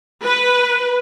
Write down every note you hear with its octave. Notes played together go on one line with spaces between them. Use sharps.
B4